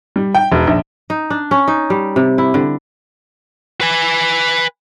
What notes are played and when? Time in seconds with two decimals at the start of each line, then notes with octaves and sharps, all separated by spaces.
0.16 G3
0.35 G5
0.52 E1
0.67 A#1
1.10 D#4
1.30 D4
1.51 C#4
1.68 D#4
1.90 G3
2.16 C3
2.38 E4
2.54 D3
3.81 B4 G#5